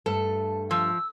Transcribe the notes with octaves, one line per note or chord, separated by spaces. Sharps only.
G2 A3 A4
F3 E6